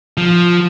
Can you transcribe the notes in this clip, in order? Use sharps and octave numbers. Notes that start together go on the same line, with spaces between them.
F3